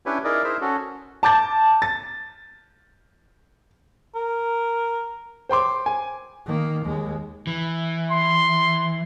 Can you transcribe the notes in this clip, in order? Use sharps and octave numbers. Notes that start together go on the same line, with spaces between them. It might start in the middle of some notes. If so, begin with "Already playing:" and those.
C#4 D4 E4 G4 B4 C#5
D#4 E4 G#4 A#4 D5
E4 G#4 A#4 C5 E5
C#4 F#4 A4
A5 D6 G6 A6
A6
A#4
C5 G5 C6 D6
G#5
D#3 A#3
D#2 G#3
E3
C6